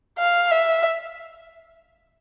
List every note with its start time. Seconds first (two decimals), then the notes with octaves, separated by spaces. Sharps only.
0.19 F5
0.51 E5